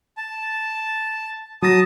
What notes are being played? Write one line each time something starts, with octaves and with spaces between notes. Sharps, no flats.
A5
F#3 A5 D#6 A#6